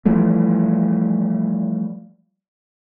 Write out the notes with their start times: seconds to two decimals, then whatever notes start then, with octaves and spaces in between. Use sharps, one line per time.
0.05 E3 F3 G3 A3